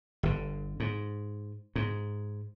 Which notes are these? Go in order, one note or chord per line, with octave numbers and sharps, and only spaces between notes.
G1 D3
G#2
G#2